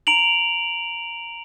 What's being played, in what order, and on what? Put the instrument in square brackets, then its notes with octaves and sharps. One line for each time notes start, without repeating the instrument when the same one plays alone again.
[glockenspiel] A#5 D7 F7 F#7